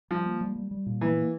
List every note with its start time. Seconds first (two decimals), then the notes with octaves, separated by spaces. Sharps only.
0.10 F3 G3
0.26 A#3
0.41 G3
0.56 G3
0.71 G3
0.86 A#2
1.01 E3 A#3
1.16 A#3